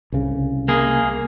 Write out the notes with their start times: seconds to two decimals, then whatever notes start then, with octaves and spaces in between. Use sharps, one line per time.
0.12 C2 C#3
0.68 A#3 G#4